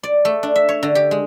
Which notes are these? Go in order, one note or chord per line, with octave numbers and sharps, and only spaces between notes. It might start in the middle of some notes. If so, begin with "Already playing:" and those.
D5
A3
D4
E5
C#5
D3
G4
G#3